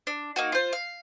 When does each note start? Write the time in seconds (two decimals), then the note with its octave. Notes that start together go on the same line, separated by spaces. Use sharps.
0.07 D4
0.36 A#3 D#4 F#4
0.52 F4 C5
0.73 F5